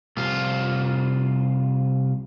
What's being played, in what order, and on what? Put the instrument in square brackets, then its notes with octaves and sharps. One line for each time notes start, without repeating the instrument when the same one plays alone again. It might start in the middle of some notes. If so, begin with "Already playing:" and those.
[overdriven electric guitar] C2 F4